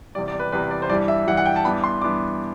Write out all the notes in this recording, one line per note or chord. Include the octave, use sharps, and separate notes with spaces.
E2 C3 G3 D5
D5
B4
E2 C3 G3 B4
D5
C5
G2 E3 G3 D5
E5
G2 E3 G3 F#5
F#5
G5
A5
G2 E3 B3 D4 B5
C6
G2 E3 B3 D4 D6